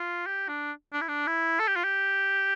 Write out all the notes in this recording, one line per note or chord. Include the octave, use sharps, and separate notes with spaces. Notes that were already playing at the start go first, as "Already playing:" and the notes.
Already playing: F4
G4
D4
D4
E4
D4
E4
A4
G4
F4
G4